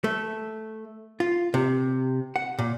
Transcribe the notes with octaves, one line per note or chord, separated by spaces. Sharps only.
A3
F4
C3
F#5
A#2